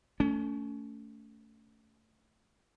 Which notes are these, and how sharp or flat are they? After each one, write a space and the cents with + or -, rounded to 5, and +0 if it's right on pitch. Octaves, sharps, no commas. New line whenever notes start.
A3 +5 C#4 +30